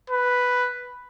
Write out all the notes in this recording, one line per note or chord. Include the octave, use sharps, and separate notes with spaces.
B4